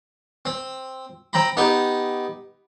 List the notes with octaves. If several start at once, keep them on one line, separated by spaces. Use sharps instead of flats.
C4
C4 G5 A#5 B5
B3 D#4 G4